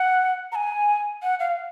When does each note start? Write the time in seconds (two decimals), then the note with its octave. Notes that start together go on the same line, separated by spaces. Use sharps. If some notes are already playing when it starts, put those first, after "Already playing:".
Already playing: F#5
0.52 A#5
0.55 G#5
1.23 F#5
1.40 F5